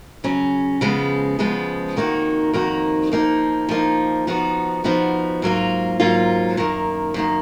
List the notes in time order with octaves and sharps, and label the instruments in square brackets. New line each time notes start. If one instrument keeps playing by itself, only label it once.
[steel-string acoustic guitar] C#3 F#3 C#4
C#3 F3 G#3 B3
C#3 F3 G#3 B3
F2 D#3 A#3 D#4 F#4
F2 D#3 A#3 D#4 F#4
F3 A#3 D#4
F3 A#3 D#4
F3 B3 D#4 F#4
F3 B3 D#4 F#4
G#2 F#3 A#3 F4
G#2 F#3 A#3 F4
F#2 D#3 A#3
F#2 D#3 A#3